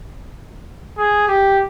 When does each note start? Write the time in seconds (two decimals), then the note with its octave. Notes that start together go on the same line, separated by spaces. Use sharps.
0.98 G#4
1.28 G4